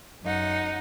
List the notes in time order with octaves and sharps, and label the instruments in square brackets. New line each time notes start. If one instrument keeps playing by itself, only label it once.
[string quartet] F#2 D#4 F#5